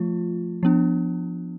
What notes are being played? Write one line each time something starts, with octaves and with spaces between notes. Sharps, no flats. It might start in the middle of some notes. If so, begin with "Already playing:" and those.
Already playing: F3 A3 F4
F3 B3 D4